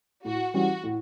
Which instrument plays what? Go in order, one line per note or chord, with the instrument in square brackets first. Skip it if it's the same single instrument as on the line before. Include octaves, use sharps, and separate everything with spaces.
[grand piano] A2 [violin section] F#4
[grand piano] E3 G3 C#4 [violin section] F#4
[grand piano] A2